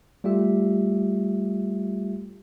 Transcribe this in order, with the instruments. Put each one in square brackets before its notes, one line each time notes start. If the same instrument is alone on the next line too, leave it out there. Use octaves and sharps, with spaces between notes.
[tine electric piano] G3 A3 F4 G4 E5